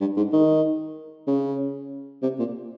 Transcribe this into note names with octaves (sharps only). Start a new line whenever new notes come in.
G2
G#2
D#3
C#3
C3
A#2